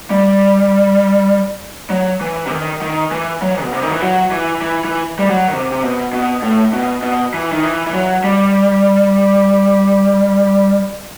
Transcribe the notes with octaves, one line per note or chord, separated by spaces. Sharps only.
G3
F#3
E3
C3
D#3
D#3
E3
F#3
B2
C3
D#3
E3
F#3
E3
E3
E3
G3
F#3
D#3
C3
C3
B2
B2
A2
B2
B2
E3
D#3
E3
E3
F#3
G3